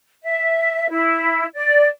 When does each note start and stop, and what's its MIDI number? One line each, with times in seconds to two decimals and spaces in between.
0.23 0.86 76
0.89 1.45 64
1.55 1.85 74